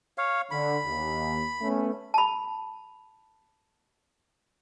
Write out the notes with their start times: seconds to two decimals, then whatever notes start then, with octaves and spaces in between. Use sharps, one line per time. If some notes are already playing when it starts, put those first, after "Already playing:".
0.18 C#5 F5
0.51 D3 B5
0.85 D#2
1.61 A3 B3 C#4
2.14 A5 B5